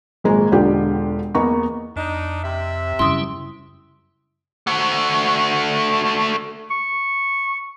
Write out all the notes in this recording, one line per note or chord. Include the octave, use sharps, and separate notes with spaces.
G#1 A#2 G#3 A#5
E1 D3 D4 F4 G4 G5
E2 A#3 B3 D#5 A#5 C#6
F2 D4 D#4
C3 E5
F#2 C#3 G3 C#4 E4 C6 D#6
A3 F#4
C#6